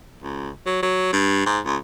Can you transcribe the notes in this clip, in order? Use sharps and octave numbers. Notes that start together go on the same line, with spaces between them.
C#2
F#3
F#3
G2
G#2
C#2